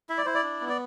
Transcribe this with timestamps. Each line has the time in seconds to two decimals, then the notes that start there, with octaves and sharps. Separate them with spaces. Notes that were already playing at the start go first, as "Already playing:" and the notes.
0.09 E4 E5
0.18 D5
0.25 E4 C5
0.34 D5
0.43 D4
0.61 B3
0.69 D5